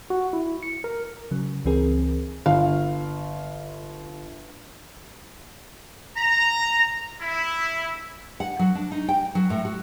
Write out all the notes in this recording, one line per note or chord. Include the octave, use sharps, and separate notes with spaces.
F#4
E4
C#7
A#4
C#3 F#3
C#2 E3 C4 G#4 A#4
G1 F5
A#5
E4
F#5
F#3
D4
D#4
G5
F#3
A2
F#4